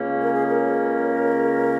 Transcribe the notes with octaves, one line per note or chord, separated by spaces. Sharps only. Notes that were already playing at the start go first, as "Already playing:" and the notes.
Already playing: C#2 C#3 A#3 C#4
A#4
G#4
A#4